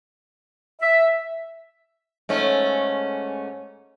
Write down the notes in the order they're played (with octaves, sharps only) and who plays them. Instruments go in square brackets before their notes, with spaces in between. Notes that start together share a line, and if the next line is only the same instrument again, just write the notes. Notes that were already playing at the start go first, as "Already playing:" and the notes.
[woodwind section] E5
[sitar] G#2 A3 C#4